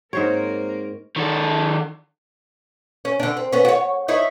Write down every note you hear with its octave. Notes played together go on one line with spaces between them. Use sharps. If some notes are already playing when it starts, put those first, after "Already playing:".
G#2 A#3 C4 A#4 C5 C#5
D#3 A4
C#4
D3 D4
C4
B3 C#4
F#4 C#5
D#4 E4 C#5